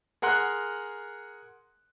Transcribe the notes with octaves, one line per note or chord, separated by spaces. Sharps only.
G#4 A#4 F#5 C6 F#6